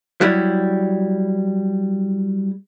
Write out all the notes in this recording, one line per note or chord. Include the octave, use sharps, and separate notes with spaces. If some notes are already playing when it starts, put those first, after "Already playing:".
F#3 G3 E4